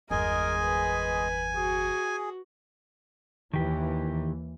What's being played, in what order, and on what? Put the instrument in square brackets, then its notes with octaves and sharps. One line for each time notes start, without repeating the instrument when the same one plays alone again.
[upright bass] G1 E2 [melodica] G#3 G#4 D#5 [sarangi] A#4 [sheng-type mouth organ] G#5
[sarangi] B4
[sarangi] F#4 [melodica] G#4
[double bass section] D#2 E3 [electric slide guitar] D#3 G4